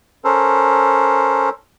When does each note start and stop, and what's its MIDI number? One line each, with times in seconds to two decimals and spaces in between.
0.24 1.49 61
0.24 1.49 69
0.24 1.49 70
0.24 1.49 72